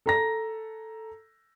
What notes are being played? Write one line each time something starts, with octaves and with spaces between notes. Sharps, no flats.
A4 A#5 A#6